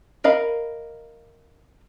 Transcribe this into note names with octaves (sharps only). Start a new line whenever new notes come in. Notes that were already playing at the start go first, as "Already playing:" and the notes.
A#4 D#5 F5 B5